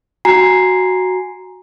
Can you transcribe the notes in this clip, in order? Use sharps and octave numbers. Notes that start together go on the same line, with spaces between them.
F#4 G#5 A#5 C7